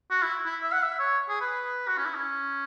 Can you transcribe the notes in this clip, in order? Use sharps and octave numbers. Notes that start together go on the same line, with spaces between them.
F#4
E4
E4
E5
F#5
E5
C#5
G#4
B4
F#4
C#4
E4
C#4